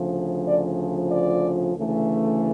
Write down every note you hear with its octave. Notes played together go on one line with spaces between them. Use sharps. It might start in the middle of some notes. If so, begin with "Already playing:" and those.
Already playing: D2 C#3 F3
D5
D5
D2 C#3 E3 A3